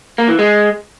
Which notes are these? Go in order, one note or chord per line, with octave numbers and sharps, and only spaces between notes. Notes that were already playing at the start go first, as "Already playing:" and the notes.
A#3
E3
G#3